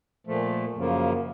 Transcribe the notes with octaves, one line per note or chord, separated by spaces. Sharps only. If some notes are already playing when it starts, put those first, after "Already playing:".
A#2 F3 A3
F#2 C#3 F3 A#3